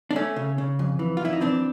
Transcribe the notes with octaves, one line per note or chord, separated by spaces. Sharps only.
D4
A3 C#4
C#3
C#3
F2
E3
F4
F2 E4
D#4
E3 C4 D4